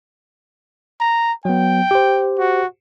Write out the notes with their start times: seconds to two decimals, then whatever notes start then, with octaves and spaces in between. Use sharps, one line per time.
1.00 A#5
1.45 F#3 B3 G5
1.91 G4 C5
2.39 F#4